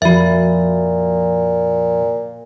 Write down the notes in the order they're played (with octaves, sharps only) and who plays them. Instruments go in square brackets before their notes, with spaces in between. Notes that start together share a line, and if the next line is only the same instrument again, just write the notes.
[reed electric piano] F2 F3 [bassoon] A#2 [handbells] F#4 E5